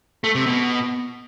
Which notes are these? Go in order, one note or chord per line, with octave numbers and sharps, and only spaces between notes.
A3
C3
B2